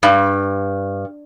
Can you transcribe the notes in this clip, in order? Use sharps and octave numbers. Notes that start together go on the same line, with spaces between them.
G2